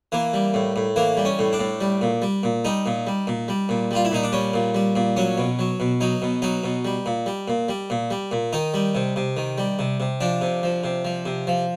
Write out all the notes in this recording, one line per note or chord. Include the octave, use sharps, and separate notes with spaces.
E3 A#3
G3
A2
A2
E3 A#3
G3
C#4
A2
D4
A2
G3
A#2
G3
A#2
G3 D#4
A#2
G3
A#2
G3
A#2
G3 F4
E4
A#2 D#4
D4
G3 C#4
A#2
G3
A#2
F#3 C#4
B2
F#3
B2
F#3 D#4
B2
F#3 D#4
B2
G3
A#2
G3
A#2
G3
A#2
G3
A#2
D#3 D#4
G3
C3
C3
D#3
G3
C3
C3
F3 D4
C3
F3
C3
F3
C3
F3